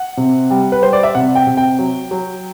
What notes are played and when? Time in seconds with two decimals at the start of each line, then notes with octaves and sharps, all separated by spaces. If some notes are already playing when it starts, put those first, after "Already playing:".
Already playing: F#5
0.17 C3
0.50 G3
0.72 B4
0.82 G3 C5
0.93 D5
1.03 E5
1.15 C3 F#5
1.35 G5
1.47 C3
1.57 G5
1.79 F#3
2.11 F#3